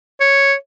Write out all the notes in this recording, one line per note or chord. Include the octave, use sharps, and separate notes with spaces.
C#5